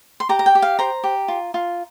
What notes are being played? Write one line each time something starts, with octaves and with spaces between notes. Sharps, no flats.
C6
G4 A#5
A#5
G5
G4
F5
C5 A#5
G4
F4
F4